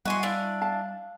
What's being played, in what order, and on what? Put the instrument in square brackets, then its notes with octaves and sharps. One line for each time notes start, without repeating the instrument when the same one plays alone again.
[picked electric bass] G3 [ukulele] E4 D#5 F#5 [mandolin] F#4 G#5 C6
[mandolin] D4 E4 [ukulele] F5
[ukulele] F5 A5